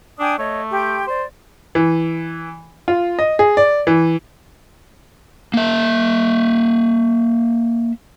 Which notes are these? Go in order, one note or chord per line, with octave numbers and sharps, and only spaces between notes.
D4 G5 G#5 D#6
A3 C#5 D#5
G4 G5 C6
C5 D5
E3
F4
D#5
G#4
D5
E3
A#3 E5